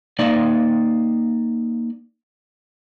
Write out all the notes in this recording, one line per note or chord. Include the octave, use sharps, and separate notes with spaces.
A#3 D#4 D5 F5